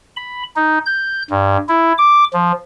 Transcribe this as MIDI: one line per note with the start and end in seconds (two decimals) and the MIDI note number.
0.17 0.43 83
0.56 0.79 63
0.86 1.23 91
1.30 1.57 43
1.69 1.93 64
1.98 2.24 86
2.33 2.52 53